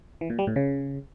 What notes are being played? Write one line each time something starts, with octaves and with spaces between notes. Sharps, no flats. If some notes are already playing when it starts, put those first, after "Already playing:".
E3
A#2
G3
A2
C#3